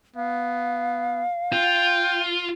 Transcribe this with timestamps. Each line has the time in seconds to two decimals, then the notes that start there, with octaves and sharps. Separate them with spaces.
0.16 B3 F5
1.53 F4 G5